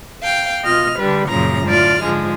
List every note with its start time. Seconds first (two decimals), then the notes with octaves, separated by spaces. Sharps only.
0.22 F5 G5
0.64 B2 F4 D#5 F6
0.98 D3 G3 B4
1.27 F#2 A#2 C#3 F3 A#5
1.66 A2 D3 F4 D5 F6
2.03 G#2 D3 F3 G#3